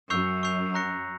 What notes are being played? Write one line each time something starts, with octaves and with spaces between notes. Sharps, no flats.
F#2 C#6 E6 G6 C7 F7
C#6 E6 G6 C7 F7
A#5 C#6 F#6 A#6 C#7